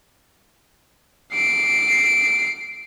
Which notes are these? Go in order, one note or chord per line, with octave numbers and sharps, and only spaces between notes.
C7 D7